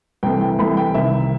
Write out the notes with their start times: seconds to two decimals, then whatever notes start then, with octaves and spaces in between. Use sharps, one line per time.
0.23 C2 C3 E3 A3 G5
0.41 G5
0.59 C2 C3 E3 A3 B5
0.77 G5
0.94 C2 C3 D#3 E5